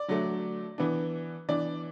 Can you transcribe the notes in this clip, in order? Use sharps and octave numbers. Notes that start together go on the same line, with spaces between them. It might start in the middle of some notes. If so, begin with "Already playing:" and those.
Already playing: D5
D3 F#3 A3 D4
E3 B3 D4
E3 B3 D4 D5